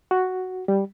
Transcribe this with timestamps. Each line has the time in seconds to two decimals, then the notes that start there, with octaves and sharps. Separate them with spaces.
0.11 F#4
0.68 G3